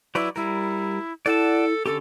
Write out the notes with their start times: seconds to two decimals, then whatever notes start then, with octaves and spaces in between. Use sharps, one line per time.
0.15 F#3 E4 B4 D5
0.36 G3 E4 A#4
1.26 E4 A4 D5 F#5 A5
1.86 D3 C#4 G4 A4